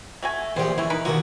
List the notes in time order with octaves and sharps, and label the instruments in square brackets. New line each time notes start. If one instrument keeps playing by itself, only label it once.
[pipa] A3 F#4 G#5
[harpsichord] A#1 E2 G4 [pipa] G3 C5
[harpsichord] E3 [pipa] C#4 E4
[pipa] D#4 A#4 B4
[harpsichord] D#2 B2 F#4 [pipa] D3 F#3 A#3